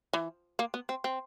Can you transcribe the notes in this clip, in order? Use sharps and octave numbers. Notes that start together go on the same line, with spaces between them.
E3
A#3
B3
C4
C4